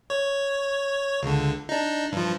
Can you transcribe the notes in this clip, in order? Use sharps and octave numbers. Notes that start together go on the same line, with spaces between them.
C#5
C#2 D3
D4 D#4
G2 F3